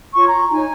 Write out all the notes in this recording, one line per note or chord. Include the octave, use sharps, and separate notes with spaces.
F4 C#5 C#6
A#5
D#4 C#5 G#5